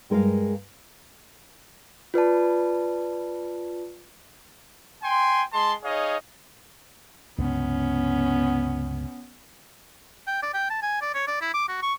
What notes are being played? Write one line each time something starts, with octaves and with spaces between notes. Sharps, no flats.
G2 G#3 A#4 B4 F5
F4 B4 D5 A5
G5 G#5 C6
G#3 A5 C6
D#4 G#4 C#5 D#5 F5
C#2 G2 C3 B3 C#4
G5
D5
G5
A5
G#5
D5
C#5
D5
E4
D6
F#4
C#6